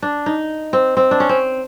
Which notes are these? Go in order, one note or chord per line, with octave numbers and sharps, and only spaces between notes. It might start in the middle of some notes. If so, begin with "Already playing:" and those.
D4
D#4
C4
C4
D4
C#4
C4